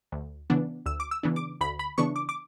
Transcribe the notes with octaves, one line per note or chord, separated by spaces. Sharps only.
D2
C#3 E3 B3 D4
D2 E6
D6
E6
C#3 E3 B3 D4
D6
D2 B5
B5
C#3 E3 B3 D4 C#6
D6
D6